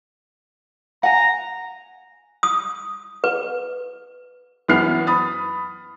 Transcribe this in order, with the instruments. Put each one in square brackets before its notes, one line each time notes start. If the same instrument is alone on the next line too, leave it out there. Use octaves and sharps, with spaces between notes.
[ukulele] F#5 G#5 [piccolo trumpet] A#5
[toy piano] D#6
B4
[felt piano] F#2 E3 B3 E4 F6 C7
B5 D#6 A6